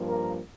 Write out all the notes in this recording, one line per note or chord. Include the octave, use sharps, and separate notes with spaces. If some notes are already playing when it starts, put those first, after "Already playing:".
Already playing: G2 F3 A#3
A#4